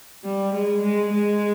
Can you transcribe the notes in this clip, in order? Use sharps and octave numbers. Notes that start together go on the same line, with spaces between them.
G3
G#3
G#3
G#3